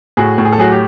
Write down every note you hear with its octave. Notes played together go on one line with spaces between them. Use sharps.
A2 F#4 G#4
A2
G#4
A4
F#3 F#4 G#4
G4